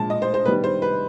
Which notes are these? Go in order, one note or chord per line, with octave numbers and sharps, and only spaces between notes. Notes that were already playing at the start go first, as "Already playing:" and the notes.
Already playing: A#2 F3 G#3 A5
D#5
C5
C5
D#3 G3 B3 B4
C5
B4